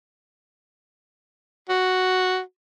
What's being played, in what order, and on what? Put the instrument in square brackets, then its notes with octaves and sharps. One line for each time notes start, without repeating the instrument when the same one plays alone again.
[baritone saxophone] F#4